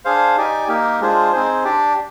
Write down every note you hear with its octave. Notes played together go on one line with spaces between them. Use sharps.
D4 G#4 C5 F5
D#4 G4 D5 G#5
A#3 D#4 G4 A#4
G#3 D4 F4 G#4 C5
C4 D#4 G#4 C5
D4 G4 D5